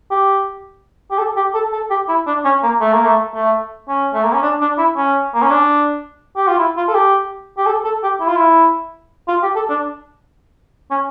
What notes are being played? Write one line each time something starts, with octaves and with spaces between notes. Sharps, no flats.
G4
G4
A4
G4
A4
A4
G4
E4
D4
C#4
A#3
A3
A#3
A3
A3
C#4
A3
A#3
C#4
D4
D4
E4
C#4
A#3
C#4
D4
G4
F4
E4
F4
A4
G4
G4
A4
A4
G4
E4
F4
E4
F4
G4
A4
D4
C#4